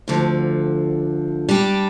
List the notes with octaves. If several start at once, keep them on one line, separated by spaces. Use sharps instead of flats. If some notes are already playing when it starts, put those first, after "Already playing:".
D2 D3 F3
G3 D4 G4